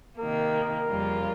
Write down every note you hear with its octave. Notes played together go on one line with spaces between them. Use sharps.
C3 D#3 A#3 A#4
F2 C#3 G3 A#3 F4